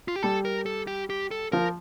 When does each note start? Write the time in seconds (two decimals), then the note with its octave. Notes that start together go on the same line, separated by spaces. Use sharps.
0.08 F4
0.16 G4
0.23 G3 A4
0.45 A#4
0.66 A4
0.87 G4
1.10 G4
1.31 A4
1.52 F3 A#4